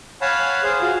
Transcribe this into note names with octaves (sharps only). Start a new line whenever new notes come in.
C#5 F5 F#5 G#5 A5 B5
G#4 C5 F5
F4 F#4 F5